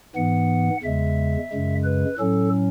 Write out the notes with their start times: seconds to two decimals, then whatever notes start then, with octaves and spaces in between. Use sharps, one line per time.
0.15 G#2 E3 B3 F#5
0.83 E2 C#3 G#3 E5
1.51 F#2 C#3 G#3
1.84 B4
2.18 A2 F#3 C#4 A4